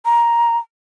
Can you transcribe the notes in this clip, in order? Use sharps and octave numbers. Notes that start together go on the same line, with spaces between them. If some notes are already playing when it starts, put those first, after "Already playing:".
A#5